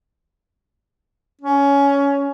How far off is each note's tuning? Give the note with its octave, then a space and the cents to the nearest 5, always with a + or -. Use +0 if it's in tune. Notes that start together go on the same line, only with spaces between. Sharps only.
C#4 +15